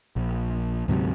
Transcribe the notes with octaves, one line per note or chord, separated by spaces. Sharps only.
A#1
D2 G#2 C3 F#3